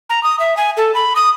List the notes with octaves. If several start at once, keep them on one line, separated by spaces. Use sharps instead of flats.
A#5
D#6
E5
G#5
A4
B5
D#6